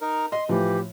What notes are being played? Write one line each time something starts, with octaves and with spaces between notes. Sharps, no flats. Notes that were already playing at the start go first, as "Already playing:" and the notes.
D#4 A#4
D#5 C6
A2 E3 F3 G4